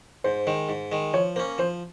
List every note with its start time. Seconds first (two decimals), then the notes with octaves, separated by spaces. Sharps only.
0.24 G#2 C5
0.47 D#3 G#3
0.69 G#2
0.92 D#3 G#3
1.14 F3 C#5
1.36 A#3 C#4 C5
1.58 F3 C5